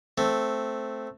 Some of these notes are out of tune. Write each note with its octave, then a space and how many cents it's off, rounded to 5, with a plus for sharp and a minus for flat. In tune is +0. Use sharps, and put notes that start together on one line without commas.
A3 +0 C4 +0